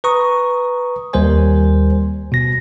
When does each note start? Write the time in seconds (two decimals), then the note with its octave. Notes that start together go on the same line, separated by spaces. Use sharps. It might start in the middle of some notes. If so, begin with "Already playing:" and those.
0.04 B4 A#5 C#6 D#6
1.13 D#2 G3 A#4 C5 G#5
2.32 B2 A#6